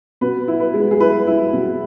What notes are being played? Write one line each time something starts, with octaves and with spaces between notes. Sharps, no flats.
B2 B4
E4
B4
G#3
G#4
E4 B4
E4
B2